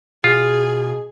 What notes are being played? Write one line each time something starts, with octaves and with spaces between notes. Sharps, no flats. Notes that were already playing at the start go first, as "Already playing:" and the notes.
B2 F4 G#4